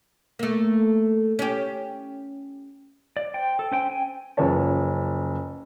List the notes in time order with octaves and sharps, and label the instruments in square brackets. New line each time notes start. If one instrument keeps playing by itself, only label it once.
[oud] A3 A#3
C#4 G4
[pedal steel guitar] D5
C5 G5
A4
C#4 C5 G5
G5 G#5
[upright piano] F#1 C#2 F3 B4 C#5 A5